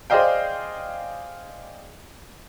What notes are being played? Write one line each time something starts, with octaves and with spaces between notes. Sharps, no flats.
G#4 C5 D5 D#5 F5 G5